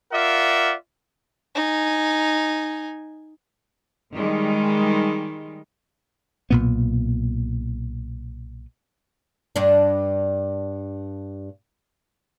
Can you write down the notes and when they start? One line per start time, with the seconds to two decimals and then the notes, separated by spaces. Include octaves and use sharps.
0.12 F4 A#4 D5 E5 F#5
1.55 D#4 G#5
4.14 D#3 G3 G#3
6.50 B1 A#2 B3
9.56 G2 D4